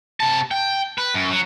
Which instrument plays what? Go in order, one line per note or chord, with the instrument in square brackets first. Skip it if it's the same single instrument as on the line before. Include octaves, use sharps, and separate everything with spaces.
[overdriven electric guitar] C3 A5
G5
B4
F#2
F#3